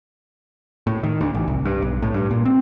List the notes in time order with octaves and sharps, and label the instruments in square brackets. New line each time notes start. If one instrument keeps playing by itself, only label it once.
[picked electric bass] A2
D#3
D2
A1
C2
G2
B1
A2
G2
A#2
C4